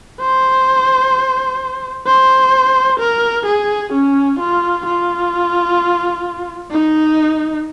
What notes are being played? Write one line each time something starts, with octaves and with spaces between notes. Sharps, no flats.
C5
C5
A#4
G#4
C#4
F4
F4
D#4